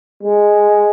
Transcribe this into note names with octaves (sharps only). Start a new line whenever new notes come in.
G#3